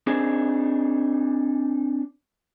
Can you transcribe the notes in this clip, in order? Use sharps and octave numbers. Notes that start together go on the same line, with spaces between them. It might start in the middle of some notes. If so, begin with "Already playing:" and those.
C4 D4 D#4 G#4 C5